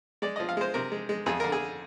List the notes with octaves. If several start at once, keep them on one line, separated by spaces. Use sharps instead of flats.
G#3 D5
F3 D#5
F5
G#3 C5
C3 A#4
G#3
G#3
F2 G#4
D3 A#4
G#4